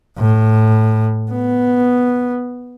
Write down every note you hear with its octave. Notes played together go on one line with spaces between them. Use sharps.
A2
B3